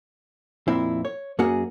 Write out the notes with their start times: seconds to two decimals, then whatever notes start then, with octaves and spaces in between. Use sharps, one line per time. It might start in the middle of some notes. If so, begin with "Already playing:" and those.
0.68 F2 A#2 C4 E4
1.05 C#5
1.39 F#2 A#3 C#4 F#4 G#4 F#5